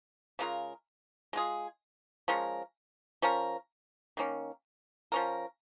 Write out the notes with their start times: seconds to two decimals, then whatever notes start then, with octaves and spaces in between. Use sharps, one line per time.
0.39 C#3 G#3 F4 A#4
1.33 G#3 F4 G#4
2.28 F3 G#3 C#4 A#4
3.22 F3 C#4 A#4
4.17 D#3 A#3 C#4
5.12 F3 C#4 A#4